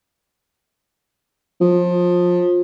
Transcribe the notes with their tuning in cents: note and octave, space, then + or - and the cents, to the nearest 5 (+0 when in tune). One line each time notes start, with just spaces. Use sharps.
F3 +25